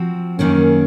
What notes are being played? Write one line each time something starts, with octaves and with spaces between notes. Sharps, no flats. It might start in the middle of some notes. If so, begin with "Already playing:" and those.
Already playing: F3 C4 F#4
F#2 D#3 A#3 C#4